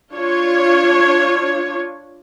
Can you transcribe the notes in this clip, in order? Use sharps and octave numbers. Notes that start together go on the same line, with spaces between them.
D4 F4 C#5